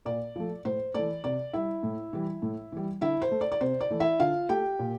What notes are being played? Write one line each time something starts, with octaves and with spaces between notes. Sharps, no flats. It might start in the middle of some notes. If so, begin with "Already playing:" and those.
A#2 D5
F3 A3
A2 C5
E3 A3 D5
C3 D5
G3 E4 E5
A2
E3 G3
A2
E3 G3
D3 E4 E5
C5
A3
D5
D5
C3 C5
D5
E3 A3
E4 E5
D3 F4 F5
A3 G4 G5
A#2